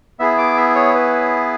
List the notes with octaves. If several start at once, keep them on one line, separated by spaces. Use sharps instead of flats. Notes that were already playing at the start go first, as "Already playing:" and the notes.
B3 E4 G#4 E5
D6
E5
C#5
B4